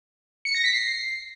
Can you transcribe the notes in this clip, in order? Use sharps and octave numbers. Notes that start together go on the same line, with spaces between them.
C#7
A#6
B6
C7